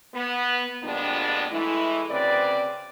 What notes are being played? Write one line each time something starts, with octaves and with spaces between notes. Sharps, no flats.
B3
F2 A#2 G3 G#3 B3 D4
E3 G#3 A3 E4
D2 C#3 C4 B4 D5